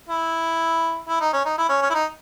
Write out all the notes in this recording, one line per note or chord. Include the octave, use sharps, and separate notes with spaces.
E4
E4
D#4
C#4
D#4
E4
C#4
C#4
E4
D#4